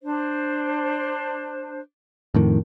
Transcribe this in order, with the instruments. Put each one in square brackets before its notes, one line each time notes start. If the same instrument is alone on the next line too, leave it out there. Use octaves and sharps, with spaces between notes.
[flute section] D4 C5
[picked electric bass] F2 A2 D#3